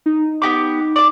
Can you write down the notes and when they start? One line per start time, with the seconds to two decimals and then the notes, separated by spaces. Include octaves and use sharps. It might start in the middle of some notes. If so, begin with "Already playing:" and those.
0.06 D#4
0.42 B3 G4 D6
0.96 D5 D6